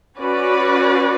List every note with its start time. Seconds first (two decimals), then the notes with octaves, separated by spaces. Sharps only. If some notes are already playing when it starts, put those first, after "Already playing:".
0.17 C#4 F#4 B4 D5